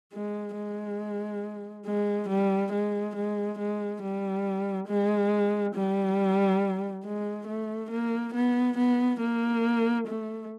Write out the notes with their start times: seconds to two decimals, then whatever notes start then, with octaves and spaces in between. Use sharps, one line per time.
0.13 G#3
0.57 G#3
1.86 G#3
2.29 G3
2.73 G#3
3.16 G#3
3.59 G#3
4.02 G3
4.88 G#3
5.75 G3
7.04 G#3
7.47 A3
7.91 A#3
8.34 B3
8.77 B3
9.20 A#3
10.07 A3